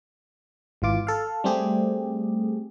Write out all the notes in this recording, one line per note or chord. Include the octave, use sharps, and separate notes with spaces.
G#1 E3 F4 D6
A4 F5
G3 A3 C4 G4 G#4